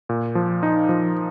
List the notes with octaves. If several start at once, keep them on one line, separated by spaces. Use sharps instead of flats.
A#2
F3
D#4
F3